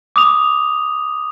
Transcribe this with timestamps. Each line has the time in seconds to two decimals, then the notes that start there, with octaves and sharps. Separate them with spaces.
0.16 D6 D#6 F7